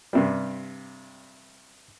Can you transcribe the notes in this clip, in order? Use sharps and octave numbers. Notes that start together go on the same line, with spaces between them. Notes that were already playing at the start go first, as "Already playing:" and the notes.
G2 C3 G3